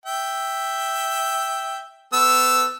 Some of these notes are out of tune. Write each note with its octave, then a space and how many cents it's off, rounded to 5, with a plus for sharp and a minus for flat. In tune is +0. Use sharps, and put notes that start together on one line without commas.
E5 +0 G5 +0
B3 +35 A4 +0 E6 +0